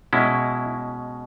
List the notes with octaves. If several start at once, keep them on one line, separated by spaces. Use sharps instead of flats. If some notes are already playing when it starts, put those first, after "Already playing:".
B2 G#3 C#4 E4